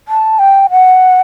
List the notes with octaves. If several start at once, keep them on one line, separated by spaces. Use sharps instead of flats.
A5
G5
F#5